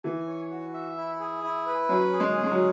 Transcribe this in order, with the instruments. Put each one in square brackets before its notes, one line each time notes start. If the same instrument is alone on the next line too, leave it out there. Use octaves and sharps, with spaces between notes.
[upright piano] E3 [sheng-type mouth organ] G#5
[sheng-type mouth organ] C#5
F#4
E5
E4
G#4
E4
B4
[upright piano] F#3 [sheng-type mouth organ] C#4
[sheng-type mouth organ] G#4
[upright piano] G#3
[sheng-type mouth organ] C#4
[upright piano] G#3
F#3